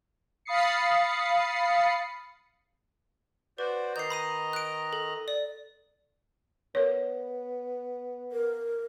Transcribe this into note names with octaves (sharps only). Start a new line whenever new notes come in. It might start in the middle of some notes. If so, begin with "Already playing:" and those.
F5 B5 D#6 A6 C7 C#7
F#4 B4 C5 D5
D#3 D#5 A#5 G6 C7
B5 D#6 D#7
F#6 D7
A4
D5
B3 A#4 C#5
A#4